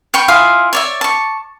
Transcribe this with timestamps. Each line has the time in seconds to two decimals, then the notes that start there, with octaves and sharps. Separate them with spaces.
0.14 G5 B5 C#6
0.28 E4 F4 G#4 F5
0.73 C#5 D5 E5
1.01 A5 C#6